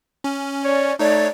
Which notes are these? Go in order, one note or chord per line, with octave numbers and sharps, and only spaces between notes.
C#4
C#5 D5
A3 D#4 C#5 D5